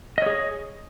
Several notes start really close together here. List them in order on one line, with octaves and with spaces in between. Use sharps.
D#5 C#5 G#4